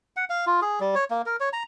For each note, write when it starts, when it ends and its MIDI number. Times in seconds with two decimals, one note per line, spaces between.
0.16 0.25 78
0.30 0.45 77
0.47 0.60 65
0.62 0.79 68
0.80 0.95 55
0.95 1.04 73
1.11 1.22 58
1.26 1.36 70
1.40 1.49 73
1.53 1.63 82